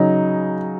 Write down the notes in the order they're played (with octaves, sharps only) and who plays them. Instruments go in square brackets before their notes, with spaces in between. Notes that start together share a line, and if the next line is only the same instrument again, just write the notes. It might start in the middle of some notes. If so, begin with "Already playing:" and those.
Already playing: [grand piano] C#3 F#3 D#4